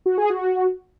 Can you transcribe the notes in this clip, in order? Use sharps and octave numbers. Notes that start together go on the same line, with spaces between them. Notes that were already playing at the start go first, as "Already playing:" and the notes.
F#4
G#4
F#4